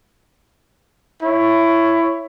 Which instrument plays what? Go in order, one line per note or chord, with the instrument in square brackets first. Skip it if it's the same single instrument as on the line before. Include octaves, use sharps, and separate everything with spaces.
[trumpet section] E4 C#5